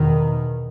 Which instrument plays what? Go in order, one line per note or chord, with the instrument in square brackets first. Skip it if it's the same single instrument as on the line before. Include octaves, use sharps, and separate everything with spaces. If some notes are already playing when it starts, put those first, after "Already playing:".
Already playing: [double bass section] E2 B2 D#3